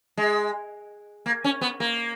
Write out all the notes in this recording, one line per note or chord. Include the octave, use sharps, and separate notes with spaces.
G#3
A#3
C#4
B3
A#3